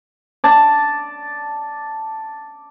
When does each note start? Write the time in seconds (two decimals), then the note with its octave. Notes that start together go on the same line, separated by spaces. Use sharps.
0.44 D5 A5